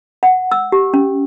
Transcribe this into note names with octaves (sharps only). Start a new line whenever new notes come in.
F#5
E6
G4
C#4